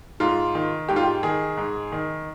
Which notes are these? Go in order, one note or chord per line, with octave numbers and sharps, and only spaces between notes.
G#2 F4
D#3
G#2 G4
F4
G4
D#3 G#4
G#2
D#3